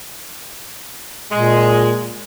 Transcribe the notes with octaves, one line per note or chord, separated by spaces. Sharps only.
A#2 G#3